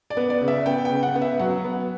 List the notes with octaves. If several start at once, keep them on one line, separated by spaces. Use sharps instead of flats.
D5
B3
D5
C#3
E5
B3 G5
G5
C#3
F#5
B3
E5
F#3 F#5
B3